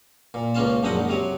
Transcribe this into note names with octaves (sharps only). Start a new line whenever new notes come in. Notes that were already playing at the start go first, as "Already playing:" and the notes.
A#2
C#2 A#3 C#4 F4 A5
A#1 F#2 C4 D4 D#5 F#5
G#2
C3 F#3 C#5